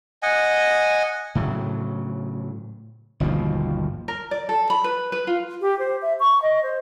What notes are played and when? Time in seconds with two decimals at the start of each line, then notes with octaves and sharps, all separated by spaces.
0.22 D#5 F#5 G#5
1.35 A2 C#3 F#3
3.20 G1 D#2 B2 F3
4.08 A#4
4.31 D5
4.49 A4
4.70 B5
4.84 B4
5.12 B4
5.27 F4
5.61 G4
5.79 C5
6.02 E5
6.20 C#6
6.42 D#5
6.63 C5